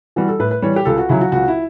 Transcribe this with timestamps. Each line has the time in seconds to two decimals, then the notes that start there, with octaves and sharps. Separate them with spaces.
0.16 E3 G3 F#4
0.28 A4
0.39 A2 B4
0.51 B4
0.62 E3 G3 C#5
0.76 G4
0.85 C#2 A4
0.98 F#4
1.09 C#3 F#3 E4
1.21 F#4
1.32 C#2 F#4
1.48 E4